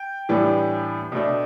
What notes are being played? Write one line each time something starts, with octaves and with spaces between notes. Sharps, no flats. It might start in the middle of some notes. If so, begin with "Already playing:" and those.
Already playing: G5
A2 E3 G3 B3 D4
B2 A3 D4